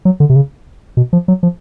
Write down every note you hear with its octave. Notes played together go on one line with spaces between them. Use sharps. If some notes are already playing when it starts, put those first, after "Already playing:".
F#3
D3
C3
C#3
B2
F3
F#3
F3